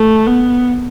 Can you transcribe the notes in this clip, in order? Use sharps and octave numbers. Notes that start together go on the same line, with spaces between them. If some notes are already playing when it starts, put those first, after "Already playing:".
Already playing: A3
B3